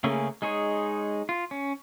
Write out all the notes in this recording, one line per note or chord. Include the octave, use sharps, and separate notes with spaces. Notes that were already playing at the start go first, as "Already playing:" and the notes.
C#3 A3 A#3 C#4 G#4
G#3 D#4 G#4 C#5
F4
C#4